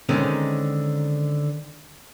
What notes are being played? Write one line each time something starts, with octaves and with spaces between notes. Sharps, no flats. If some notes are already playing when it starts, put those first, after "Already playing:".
D3 D#3 G#3 C4 C#4 D#4